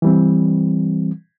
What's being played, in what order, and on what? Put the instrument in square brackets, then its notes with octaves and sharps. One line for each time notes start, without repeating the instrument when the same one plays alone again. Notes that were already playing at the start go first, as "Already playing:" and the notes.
[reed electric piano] E3 G3 C4